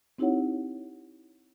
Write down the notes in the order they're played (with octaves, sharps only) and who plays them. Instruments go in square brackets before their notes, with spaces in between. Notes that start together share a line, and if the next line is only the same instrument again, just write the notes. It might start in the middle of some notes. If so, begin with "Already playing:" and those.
[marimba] C4 D#4 E4 G4 C#5 F#5